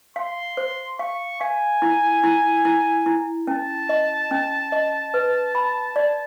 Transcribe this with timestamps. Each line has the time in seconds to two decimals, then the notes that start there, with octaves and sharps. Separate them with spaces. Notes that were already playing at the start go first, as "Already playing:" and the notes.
0.16 F5 C6
0.57 C5
0.99 F5 C#6
1.41 F5 G#5
1.82 E4
2.24 E4
2.65 E4
3.06 E4
3.47 C#4 A5
3.89 D#5
4.31 C#4
4.72 D#5
5.14 B4
5.55 B5
5.96 D5